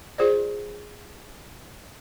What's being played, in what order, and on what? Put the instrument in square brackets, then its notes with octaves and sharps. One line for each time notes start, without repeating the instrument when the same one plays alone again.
[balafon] F4 G#4 C5 D5